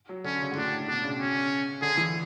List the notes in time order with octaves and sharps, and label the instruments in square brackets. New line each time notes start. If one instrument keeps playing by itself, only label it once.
[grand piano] F#3
[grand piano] D3 [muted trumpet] C#4
[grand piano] C#3
G#2
[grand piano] A2 [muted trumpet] D4
[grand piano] B2 [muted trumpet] D4
[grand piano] C#3
[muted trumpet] C#4
[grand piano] D3 [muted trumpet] G#4
[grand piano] E3